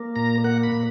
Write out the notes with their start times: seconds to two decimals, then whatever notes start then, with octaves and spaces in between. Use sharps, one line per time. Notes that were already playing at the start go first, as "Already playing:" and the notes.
Already playing: A#3
0.16 A#2 A#5
0.44 A#3 F#5
0.63 B5
0.72 A#2